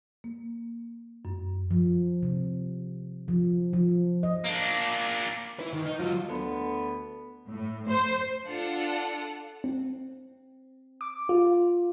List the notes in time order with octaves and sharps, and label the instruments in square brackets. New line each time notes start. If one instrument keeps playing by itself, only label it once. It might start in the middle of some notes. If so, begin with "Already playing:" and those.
[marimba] A#3
F#2
[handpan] F3
C3
F3
F3
D#5
[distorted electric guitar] A#3 D4
E4 B4
D#3
D#4
F#3 F4
[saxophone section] D2 D3 B3
[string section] A2
C5
[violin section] D4 F4 A4 F#5
[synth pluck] C4
D6
F4